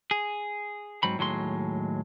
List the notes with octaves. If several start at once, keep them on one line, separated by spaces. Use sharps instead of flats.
G#4
G#2 F#3 C4 B5
D#2 A2 F#3 G#3 C6